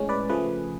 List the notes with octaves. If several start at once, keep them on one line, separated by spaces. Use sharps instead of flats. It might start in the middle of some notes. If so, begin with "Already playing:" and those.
Already playing: A2 G#3 C#4
B4 D5
C#3 F3 A3 G#4 B4